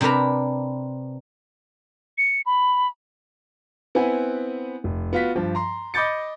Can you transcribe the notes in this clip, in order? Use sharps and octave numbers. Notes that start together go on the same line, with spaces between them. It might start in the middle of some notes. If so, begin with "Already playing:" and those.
C3 D4 A#4 B4 A#5
C#7
B5
B3 C4 E4 B4 F#5 G#5
F1
B3 F4 F#4 B6
G2 F3
A#5 C6
D#5 B5 D6 G6 A6 C#7